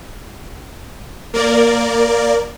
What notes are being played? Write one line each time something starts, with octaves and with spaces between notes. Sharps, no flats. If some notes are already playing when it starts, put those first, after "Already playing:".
A#3 A#4 D5